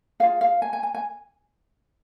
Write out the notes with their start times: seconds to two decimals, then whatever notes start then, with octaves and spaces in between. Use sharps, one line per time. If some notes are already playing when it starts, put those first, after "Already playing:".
0.20 F4 G#4 F5
0.41 F5
0.62 G#5
0.73 G#5
0.83 G#5
0.94 G#5